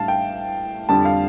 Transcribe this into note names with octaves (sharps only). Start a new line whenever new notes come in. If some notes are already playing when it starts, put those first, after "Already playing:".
Already playing: A1 A2 G3 D4 F5 A5
G5
F2 D3 G3 D4 A5
F5